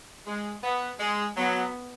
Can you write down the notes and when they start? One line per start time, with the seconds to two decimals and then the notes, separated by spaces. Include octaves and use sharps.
0.26 G#3
0.63 B3
0.99 G#3
1.36 F#3 B3